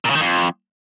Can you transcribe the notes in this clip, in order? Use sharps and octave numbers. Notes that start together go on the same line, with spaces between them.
A#2
C#3
D#3
F2